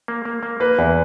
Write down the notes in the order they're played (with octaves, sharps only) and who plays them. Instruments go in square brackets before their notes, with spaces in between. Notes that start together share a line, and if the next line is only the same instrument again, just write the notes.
[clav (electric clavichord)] A#3
A#3
A#3
[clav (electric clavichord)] A#3 [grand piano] B4
[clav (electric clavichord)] E2